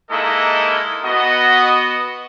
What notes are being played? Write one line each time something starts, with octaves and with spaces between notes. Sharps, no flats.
G#3 A#3 D#4 E4 A4 D#5
B3 F#4 D#5